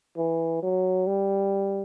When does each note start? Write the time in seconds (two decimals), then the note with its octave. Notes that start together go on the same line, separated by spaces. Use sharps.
0.17 E3
0.63 F#3
1.07 G3